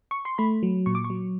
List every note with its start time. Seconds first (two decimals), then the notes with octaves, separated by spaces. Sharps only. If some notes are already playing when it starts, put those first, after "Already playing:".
0.11 C#6
0.25 C6
0.38 A3 B5
0.63 F#3
0.86 A#2 C#6
0.95 D6
1.04 C#6
1.10 F#3